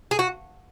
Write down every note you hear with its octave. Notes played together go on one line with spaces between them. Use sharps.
G#4
F#4